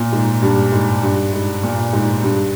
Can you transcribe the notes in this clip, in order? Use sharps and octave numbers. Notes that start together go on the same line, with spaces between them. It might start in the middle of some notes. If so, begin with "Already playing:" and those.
Already playing: A#2
G#2
G2
G#2
G2
G#2
A#2
G#2
G2